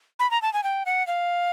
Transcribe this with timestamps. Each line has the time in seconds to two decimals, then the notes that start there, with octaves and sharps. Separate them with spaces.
0.19 B5
0.31 A#5
0.42 A5
0.53 G#5
0.64 G5
0.86 F#5
1.07 F5